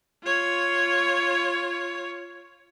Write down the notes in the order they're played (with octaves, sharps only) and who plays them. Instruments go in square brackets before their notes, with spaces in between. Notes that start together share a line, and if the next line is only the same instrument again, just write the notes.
[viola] F4 C#5